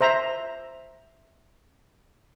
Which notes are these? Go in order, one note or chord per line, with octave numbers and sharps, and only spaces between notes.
C5 E5 A#5